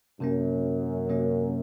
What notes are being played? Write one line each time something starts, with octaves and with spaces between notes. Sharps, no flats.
F#2 C3 F#3 A#3 C#4
C3 F#3 A#3 C#4